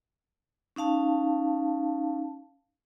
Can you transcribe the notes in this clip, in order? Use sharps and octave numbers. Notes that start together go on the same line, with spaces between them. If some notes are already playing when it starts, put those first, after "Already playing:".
C#4 D#4 F5 A5